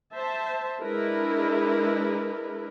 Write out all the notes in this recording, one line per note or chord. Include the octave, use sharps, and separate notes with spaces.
C5 E5 A5
G#3 D4 E4 A#4 B4